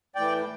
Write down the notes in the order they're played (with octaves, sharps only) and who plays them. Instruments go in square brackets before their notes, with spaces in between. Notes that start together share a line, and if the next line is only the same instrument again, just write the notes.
[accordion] A2 E3 D5 G5